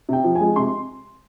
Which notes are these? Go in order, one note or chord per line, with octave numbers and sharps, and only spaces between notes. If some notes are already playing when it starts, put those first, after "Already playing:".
C3 G5
F3
G#5
G#3
C3 C6